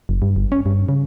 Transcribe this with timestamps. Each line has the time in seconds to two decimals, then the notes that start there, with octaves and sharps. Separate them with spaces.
0.09 F#1
0.22 G2
0.36 G1
0.52 C#4
0.66 G2
0.89 C#3